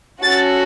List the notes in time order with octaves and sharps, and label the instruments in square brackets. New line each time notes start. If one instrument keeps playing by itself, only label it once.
[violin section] C#4 F#4 A4 A6